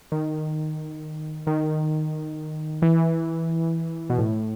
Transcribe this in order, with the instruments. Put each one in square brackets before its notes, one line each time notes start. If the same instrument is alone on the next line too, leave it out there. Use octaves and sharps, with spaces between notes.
[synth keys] D#3
D#3
E3
B2
A2